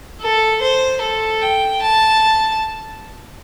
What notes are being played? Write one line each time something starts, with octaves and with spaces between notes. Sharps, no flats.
A4
C5
A4
G5
A5